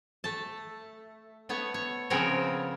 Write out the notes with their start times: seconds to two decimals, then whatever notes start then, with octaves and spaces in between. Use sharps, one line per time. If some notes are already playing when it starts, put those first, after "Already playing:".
0.24 A3 A5
1.49 A3 B3 C#5
1.74 C#5
2.10 C#3 F3 B3 C4 A#4 C#5